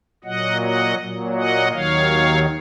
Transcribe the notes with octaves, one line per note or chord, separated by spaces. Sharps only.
A#2 F#3 D#5 F#5
D#5 F#5
A#2 F#3
D#5 F#5
D#2 D#3 F#3 C#5 F5